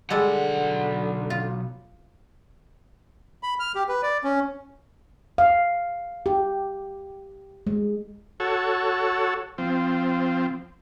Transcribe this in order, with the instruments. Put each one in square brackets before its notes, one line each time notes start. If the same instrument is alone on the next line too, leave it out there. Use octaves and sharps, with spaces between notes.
[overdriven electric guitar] B1 F#5 [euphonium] D3 [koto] G3 G#3 A4
[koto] F4
[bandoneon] B5
F6
G4
B4
D5
C#4
[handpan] F5
G4
G#3
[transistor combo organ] F#4 A4 C#5
F3 C4